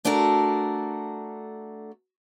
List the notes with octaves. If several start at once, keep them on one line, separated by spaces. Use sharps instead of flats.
A3 D4 F#4 A4 A#4